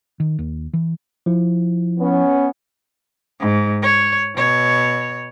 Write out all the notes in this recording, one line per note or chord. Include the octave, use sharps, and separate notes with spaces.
D#3
D#2
E3
F3 E4
B3 C#4
G#2
C#5
B2 C#5